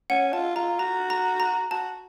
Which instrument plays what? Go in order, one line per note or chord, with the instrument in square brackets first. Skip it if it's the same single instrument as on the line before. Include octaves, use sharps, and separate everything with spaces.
[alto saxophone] C#4 [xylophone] F#5
[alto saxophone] F4 [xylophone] A5
[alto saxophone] F4 [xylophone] A#5
[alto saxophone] F#4 [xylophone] A#5
[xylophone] A#5
A#5
[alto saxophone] F#4 [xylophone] A5